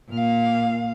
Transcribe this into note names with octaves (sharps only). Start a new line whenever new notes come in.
A#2 F5